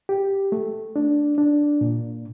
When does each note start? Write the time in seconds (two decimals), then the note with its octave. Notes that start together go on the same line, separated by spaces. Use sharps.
0.09 G4
0.52 A3
0.96 D4
1.38 D4
1.81 A#2